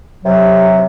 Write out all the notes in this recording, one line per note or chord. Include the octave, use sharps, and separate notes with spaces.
C3 F#3